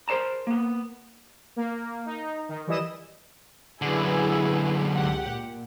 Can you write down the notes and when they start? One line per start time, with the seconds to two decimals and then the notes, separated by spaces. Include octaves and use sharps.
0.08 A#4 C5 C#5 A5 A#5
0.47 A#3 B3
1.56 A#3
2.06 D#4
2.49 D#3
2.67 E3 G3 E4 D#5 D#6 E7
3.82 F#2 D3 E4 G#4 B4
4.95 C#2 G4 F#5
5.31 A#2